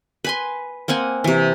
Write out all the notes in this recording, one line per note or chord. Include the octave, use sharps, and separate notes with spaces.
B4 G#5 C6
A#3 C4 F#5 G#5
C3 E3